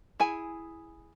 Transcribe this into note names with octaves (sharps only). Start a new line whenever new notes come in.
E4 G#4 G#5